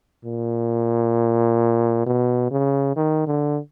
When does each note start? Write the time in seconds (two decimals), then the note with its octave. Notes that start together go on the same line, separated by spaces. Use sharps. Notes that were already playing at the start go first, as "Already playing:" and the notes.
0.25 A#2
2.06 B2
2.51 C#3
2.96 D#3
3.27 D3